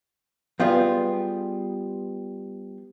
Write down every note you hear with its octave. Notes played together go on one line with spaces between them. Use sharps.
G3 B3 F4 G4 G#4